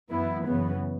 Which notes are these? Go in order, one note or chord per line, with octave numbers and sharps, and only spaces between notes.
F#2 E3 B3 E4
F#2 C#3 E3 B3